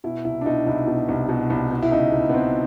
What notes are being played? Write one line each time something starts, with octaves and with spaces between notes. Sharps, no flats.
B2 E4
C2 E4
D4
B2 D#4
C2 E4
B2
C2
B2
C2
B2
E4
C#2 D#4
B2
B3
C#2 C4